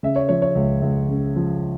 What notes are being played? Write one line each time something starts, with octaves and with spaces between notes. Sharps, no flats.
C#3 E5
C#5
F3 C#5
C#5
C#2
C#2
C#3
F3